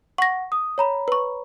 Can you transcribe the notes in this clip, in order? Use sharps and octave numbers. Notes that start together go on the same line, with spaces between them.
F#5 C#6 A#6
D#6
C#5 A#5 B5
B4 C#6